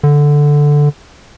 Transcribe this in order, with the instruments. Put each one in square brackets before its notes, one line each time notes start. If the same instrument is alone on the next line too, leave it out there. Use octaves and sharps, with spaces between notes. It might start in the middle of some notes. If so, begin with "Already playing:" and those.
[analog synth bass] D3